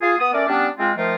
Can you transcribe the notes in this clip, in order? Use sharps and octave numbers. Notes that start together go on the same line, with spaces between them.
F4 G#4
B3 D#6
A3 C#4 A#4 D5
G3 B3 C#4 D4
G#3 C4 F4
D#3 F3 A3 F4 A#4 C5